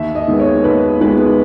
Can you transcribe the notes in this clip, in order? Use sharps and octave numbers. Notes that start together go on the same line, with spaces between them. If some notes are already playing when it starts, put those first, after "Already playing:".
Already playing: D#2 E5
D#5
D#3 G#3 B3
C#5
D#2 B4
D#3 G#3 B3 B4